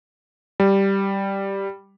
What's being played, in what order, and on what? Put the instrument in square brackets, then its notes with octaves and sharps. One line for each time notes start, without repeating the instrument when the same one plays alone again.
[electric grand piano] G3